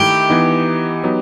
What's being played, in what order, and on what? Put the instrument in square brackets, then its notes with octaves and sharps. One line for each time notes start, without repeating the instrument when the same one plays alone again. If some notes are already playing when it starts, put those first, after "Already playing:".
Already playing: [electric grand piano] D#3 A3 E4 [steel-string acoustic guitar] G4
[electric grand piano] E3 B3 D#4
F#3 B3 D#4